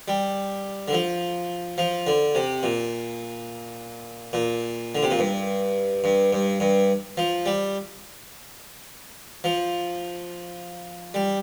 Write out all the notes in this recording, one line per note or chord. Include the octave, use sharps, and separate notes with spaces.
G3
D3
F3
F3
D3
C3
A#2
A#2
D3
C3
A#2
G2
G2
G2
G2
F3
G3
F3
G3